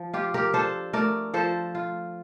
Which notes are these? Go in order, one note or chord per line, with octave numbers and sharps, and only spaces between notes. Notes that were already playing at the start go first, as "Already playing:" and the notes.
Already playing: F3
F4 G4
G4 A#4
D4 A4 C5
A3 A#4 D5
F3 A4 C5
F4